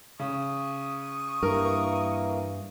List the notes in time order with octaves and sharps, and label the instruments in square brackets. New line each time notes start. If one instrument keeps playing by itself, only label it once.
[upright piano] C#3 [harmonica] C#6 D#6
[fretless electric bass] G2 [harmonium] E3 A#3 [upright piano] A#4